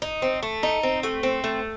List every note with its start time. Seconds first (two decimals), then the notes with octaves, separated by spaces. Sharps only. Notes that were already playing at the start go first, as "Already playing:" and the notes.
0.02 D#4
0.22 C4
0.43 A3
0.63 D#4
0.83 C4
1.03 A3
1.23 C4
1.44 A3